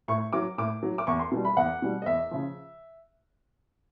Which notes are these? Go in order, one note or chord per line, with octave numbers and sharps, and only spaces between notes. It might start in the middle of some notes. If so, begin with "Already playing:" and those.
A2 C#6
F#3 D6
A2 D6
F#3
D6
E2 C#6
C6
B2 G3
B5
E2 F#5
B2 G3
D#5
E2 E5
C#3 F3